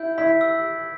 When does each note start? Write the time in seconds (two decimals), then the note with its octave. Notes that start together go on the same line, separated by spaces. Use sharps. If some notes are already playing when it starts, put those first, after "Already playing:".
Already playing: E4 G6
0.18 E4 B6
0.41 E6